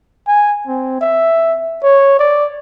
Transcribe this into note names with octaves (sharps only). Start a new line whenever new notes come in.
G#5
C4
E5
C#5
D5